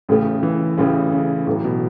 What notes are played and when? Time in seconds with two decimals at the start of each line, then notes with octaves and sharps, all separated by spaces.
0.09 A1 A2 C#3 A3 C#4
0.43 E3
0.77 A1 A2 C#3 A3 C#4
1.12 C#3
1.47 A1 A2 E3 F#3 A3
1.64 B2